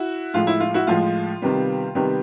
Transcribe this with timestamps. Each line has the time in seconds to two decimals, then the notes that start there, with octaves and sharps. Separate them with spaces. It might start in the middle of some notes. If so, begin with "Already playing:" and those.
Already playing: E4 F#4
0.34 A2 F3 G#3 F4
0.47 E4
0.60 F4
0.74 E4 F#4
0.87 A2 F3 G#3 F4
1.42 C3 D#3 G3 B3
1.95 C3 D#3 G3 B3